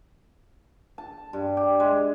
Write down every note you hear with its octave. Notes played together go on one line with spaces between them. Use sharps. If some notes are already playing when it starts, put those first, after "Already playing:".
A5
G2
G4
G#3